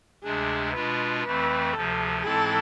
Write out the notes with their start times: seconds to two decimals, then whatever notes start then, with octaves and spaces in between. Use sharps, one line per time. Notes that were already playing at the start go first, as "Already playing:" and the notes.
0.24 D2 C3 G#3 D4 G#4
0.74 B2 G#3 D4 F4 B4
1.23 F2 E3 A3 C4 B4
1.73 D2 C3 F3 A4
2.23 G#2 E3 G#3 C4 E4 A4